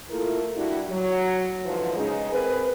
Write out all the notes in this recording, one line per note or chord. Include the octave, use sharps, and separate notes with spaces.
A3 A#3 E4 F4 A4 A#4
G3 D4 E4 F#4
F#3
G#2 D3 E3 F3
C#3 G#3 D#4
C4 G#4 A#4 B4